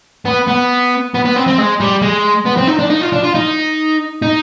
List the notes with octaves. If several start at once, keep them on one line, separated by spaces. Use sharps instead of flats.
B3
B3
B3
B3
C4
C4
G#3
G3
G#3
B3
C4
D#4
D4
D#4
F4
D4
F4
D#4
D#4